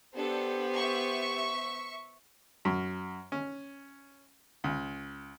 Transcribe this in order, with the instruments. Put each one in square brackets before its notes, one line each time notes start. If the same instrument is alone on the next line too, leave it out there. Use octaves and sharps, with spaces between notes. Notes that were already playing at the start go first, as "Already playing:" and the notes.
[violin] B3 C5 [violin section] D4 A4 [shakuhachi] G4
[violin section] E5 C#6
[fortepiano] F#2
C#4
C#2